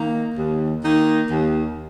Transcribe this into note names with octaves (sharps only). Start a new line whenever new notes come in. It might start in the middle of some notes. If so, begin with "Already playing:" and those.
Already playing: D#3 A#3 D#4
D#2
D#3 A#3 D#4
D#2